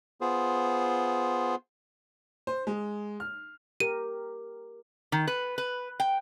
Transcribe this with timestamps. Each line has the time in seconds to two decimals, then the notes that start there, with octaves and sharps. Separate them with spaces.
0.21 B3 F4 G#4 C5
2.47 C5
2.67 G#3
3.20 F6
3.80 G4 A#4 D#7
5.12 D#3
5.27 B4
5.58 B4
6.00 G5